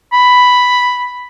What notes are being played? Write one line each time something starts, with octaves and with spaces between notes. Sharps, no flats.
B5